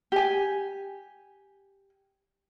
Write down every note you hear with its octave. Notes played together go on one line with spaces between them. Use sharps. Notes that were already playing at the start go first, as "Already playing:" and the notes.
G4 G#5